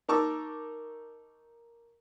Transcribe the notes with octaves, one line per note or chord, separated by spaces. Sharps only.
D#4 A#4 A5 C#6 D6 E6